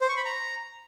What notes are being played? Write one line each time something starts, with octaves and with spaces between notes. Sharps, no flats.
C5
C#6
B5
A#5